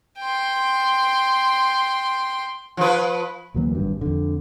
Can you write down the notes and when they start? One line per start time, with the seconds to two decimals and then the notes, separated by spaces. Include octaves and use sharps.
0.19 G5 C6
2.77 F3 B4
3.54 D2 E3 F#3 A#3
3.75 G#1 G2
4.01 F2 D3